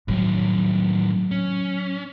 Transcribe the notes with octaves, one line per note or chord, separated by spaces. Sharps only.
A2 D#3 F#3
C#4